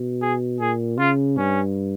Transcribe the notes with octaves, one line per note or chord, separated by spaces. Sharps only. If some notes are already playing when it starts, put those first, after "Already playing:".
Already playing: B2
G#4
A#2 G#4
C#3 F4
G2 C#4